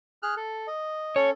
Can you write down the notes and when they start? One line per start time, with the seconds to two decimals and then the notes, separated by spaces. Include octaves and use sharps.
0.23 G#4 F6 F#6
0.37 A4
0.67 D#5
1.16 C#4 A4 C#5